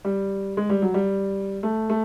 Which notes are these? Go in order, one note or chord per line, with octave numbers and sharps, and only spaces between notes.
G3
G#3
G3
F#3
G3
A3
A3